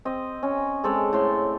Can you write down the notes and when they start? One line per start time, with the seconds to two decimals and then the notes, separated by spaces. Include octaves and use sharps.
0.05 C4 D#5
0.43 C#4
0.84 G#3 C4 A4 D5
1.13 A2 C6